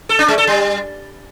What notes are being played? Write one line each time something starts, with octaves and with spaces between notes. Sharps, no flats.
A4
D4
G#3
A4
G3